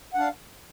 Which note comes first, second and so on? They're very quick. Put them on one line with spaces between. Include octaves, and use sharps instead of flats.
F#5 D4 F5